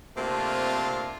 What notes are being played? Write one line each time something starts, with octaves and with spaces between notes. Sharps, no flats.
C3 A3 A#3 C4 D4 F4